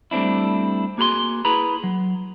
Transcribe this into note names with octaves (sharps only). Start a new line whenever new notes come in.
G3 A3 C4 D4 E4
A#3 F#4 G#4 B5 C6
E4 G#4 B4 A#5 B5
F#3